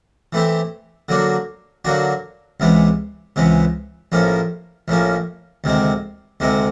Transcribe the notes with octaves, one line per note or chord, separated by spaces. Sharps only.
E3 A3 C4 E4 G4
D3 F#3 A#3 D4 F#4
D3 F#3 A#3 D4 F#4
C#2 C3 E3 G#3 B3
C#2 C3 E3 G#3 B3
A#1 A2 F3 A#3 C#4
A#1 A2 F3 A#3 C#4
D2 C3 D#3 G#3 C4
D2 C3 D#3 G#3 C4